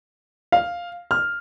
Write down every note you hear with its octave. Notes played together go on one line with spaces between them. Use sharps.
F5
F6